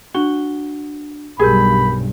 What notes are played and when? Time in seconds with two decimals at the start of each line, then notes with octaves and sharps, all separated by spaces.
0.14 D4 F#4 G7
1.39 B1 G2 G4 G#4 A#4 B5 G6